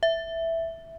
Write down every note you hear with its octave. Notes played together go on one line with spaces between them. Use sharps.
E5